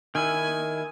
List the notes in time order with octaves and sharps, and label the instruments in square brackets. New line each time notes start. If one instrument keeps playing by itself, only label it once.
[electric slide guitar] D#3 E4 [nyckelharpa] G#5